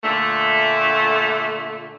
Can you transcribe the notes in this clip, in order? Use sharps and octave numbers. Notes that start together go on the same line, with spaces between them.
A#2 D3 A3